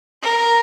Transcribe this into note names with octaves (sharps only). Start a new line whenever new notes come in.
A#4